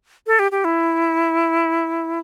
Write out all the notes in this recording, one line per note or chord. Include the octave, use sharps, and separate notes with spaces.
A4
G4
G4
E4